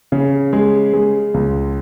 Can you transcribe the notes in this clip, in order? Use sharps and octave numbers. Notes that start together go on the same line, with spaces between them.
C#3
G#3
G#3
C#2